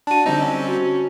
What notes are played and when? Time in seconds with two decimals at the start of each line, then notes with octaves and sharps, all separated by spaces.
0.07 D4 F#4 A5 D#7
0.26 D3 G3 C4 D#4
0.42 C#4
0.68 F#4